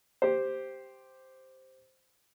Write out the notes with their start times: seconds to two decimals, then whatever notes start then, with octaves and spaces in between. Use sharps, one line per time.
0.22 G4 C5